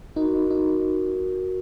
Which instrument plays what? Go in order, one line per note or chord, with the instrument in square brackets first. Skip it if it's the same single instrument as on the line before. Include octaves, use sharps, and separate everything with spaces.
[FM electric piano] D#4 [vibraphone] F#4 A#4
[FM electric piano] D#4